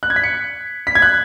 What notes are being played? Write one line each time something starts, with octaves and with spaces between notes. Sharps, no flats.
F#6
G#6
B6
C#7
B6
G#6
F#6